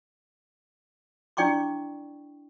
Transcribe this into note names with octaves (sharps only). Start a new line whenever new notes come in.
D4 E4 D5 G5 C#6 D6